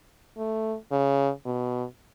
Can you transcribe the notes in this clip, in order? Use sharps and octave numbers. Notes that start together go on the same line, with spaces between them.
A3
C#3
B2